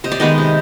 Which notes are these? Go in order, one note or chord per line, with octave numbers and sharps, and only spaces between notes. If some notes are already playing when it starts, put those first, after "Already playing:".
C3 D#5
D5
D#3 G#3 B3 D#5
C3